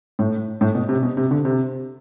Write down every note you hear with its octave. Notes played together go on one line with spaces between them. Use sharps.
A2
A2
B2
C3
B2
C3
D3
C3